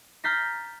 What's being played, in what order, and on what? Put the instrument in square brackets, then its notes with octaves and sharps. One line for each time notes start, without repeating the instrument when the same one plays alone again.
[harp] A#5 F6 G6 A6 B6 C7